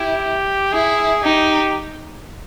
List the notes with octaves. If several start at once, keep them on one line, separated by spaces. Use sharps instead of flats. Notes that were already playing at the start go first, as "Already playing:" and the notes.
Already playing: E4 G4
E4 G#4
D#4 G4